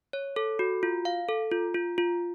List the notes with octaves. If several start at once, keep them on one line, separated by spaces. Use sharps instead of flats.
C#5
A4
F#4
F4
F5
A4
F4
F4
F4